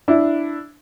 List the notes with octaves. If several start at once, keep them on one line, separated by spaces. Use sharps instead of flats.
D4 E4